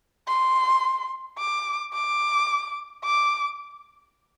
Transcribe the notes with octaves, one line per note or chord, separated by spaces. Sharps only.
C6
D6
D6
D6